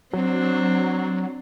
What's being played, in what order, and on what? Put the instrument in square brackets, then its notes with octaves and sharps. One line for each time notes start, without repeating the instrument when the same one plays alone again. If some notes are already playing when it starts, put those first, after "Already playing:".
[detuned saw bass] F#3 [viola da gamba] C4 D4